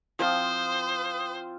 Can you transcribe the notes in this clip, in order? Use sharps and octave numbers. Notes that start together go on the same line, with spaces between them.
F3 C4 F4 C5 D#6